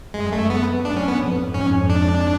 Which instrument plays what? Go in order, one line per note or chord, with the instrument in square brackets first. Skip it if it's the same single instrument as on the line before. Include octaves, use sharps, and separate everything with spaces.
[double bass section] F#2 [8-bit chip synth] G#3
[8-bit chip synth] A3
B3
[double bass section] F#2 [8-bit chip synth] D4
[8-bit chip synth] C#4
B3
[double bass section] F2 G#2
[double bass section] F2 G#2 [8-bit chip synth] C#4
[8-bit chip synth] D4